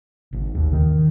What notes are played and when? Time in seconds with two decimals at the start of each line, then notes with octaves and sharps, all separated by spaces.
0.33 G#1
0.55 D#2
0.73 D#3